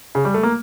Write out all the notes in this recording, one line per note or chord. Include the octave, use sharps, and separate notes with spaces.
C#3
G3
A3
A#3